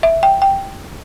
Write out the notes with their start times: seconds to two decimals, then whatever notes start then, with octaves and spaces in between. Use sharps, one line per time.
0.03 E5
0.23 G5
0.42 G5